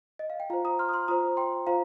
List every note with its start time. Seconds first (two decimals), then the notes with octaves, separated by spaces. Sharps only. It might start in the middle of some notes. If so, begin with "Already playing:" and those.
0.19 D#5
0.30 F5
0.40 G5
0.50 F4 C5 F5 A#5
0.65 A#5 D#6
0.79 C6 F6
0.89 D#6
0.93 C6 F6
1.08 F4 C5 A#5 D#6
1.37 G5 C6
1.67 F4 C5 F5 A#5